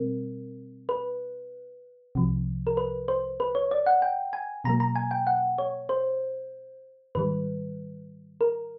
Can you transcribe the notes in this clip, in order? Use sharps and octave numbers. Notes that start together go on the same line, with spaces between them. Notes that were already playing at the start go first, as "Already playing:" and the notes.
Already playing: B2 G3 C4 A#4
B4
C2 C3 F3
A#4
B4
C5
B4
C#5
D5
F#5
G5
G#5
B2 F#3 A#3 A#5
A#5
G#5
G5
F#5
C#5
C5
G#2 D#3 G3 B4
A#4